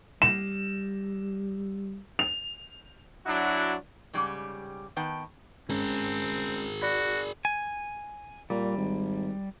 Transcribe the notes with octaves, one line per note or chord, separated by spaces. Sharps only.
G3 E7
F7
F#3 D4 E4 F#4
G#2 C#3 G3 G4
D#3 B3 G5 A5
G#3 C4 C#4 G#4 A#4
F#4 D5 B5
G#5
A#2 G3
G#1